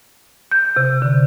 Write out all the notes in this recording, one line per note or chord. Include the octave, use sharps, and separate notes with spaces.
G6
C3
D3